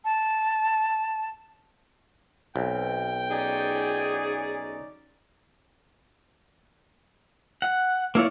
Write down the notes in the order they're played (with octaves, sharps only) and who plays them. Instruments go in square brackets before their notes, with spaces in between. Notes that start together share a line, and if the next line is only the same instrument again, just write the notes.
[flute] A5
[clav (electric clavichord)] B1 [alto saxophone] C4 [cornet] G5
[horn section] C#4 D#4 D5 [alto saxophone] G#4
[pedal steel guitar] F#5
A#3 E4 C#5 D5